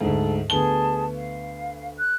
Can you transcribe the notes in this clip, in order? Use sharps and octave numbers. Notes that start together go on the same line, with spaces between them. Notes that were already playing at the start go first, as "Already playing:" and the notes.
D2 G#2 A4
D2 B3 G#4 A5 G7
F5
F#6